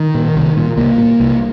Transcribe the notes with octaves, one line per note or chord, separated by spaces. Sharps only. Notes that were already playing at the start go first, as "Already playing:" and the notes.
Already playing: D#3
A#2
C2
A#2
C2 A#3
A#2
C2